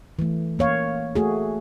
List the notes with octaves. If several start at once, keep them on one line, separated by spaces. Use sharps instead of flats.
E3 A3
A#3 C#5 F5
A3 F#4 G#4